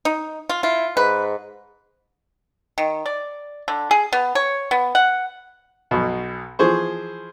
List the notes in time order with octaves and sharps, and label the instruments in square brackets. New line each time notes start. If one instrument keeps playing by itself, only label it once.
[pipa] D#4
F4
[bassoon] E4 [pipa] F4
[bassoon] G#2 [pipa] B4
[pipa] D#3
D5
D3
G#4
B3
C#5
B3
F#5
[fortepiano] B1 B2
E3 F3 G#4 C5 C#6